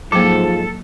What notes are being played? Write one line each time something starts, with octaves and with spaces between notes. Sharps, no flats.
G#2 F3 F#3 A#3 A4